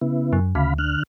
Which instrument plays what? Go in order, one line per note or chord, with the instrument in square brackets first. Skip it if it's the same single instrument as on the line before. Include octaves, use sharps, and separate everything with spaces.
[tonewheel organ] C#3 B3 E4
[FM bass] F#2
[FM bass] D2 [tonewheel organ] C#3 F5 B5
[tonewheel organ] D3 F6 F#6